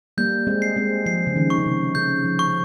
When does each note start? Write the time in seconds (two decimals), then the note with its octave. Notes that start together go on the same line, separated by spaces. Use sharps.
0.18 G3 A#3 G6
0.47 G#3 C4
0.62 C7
0.76 G#3 C4
1.06 F3 C7
1.27 C#3
1.36 D#3
1.50 C#6
1.58 C#3
1.66 C3
1.95 C#3 G6
2.24 F3
2.39 C#6